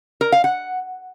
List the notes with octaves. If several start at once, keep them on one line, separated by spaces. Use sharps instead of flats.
A#4
F5
F#5